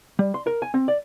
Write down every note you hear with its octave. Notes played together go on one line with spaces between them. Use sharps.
G3
C6
A#4
G#5
C4
D5